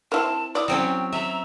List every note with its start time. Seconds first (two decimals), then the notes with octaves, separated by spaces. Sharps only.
0.12 C4 E4 A#4 A5
0.55 E4 D5 D#6
0.68 F#3 C4 C#4 G5
1.12 E5 A#5